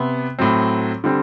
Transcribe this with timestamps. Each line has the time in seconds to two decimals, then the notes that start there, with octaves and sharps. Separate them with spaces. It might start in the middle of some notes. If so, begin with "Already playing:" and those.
Already playing: C3 B3
0.39 A2 F#3 C4
1.04 D3 G3 C4